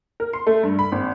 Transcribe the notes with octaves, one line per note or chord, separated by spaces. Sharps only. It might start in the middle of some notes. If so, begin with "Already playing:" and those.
A#4
C6
A3
G2
B5
G#1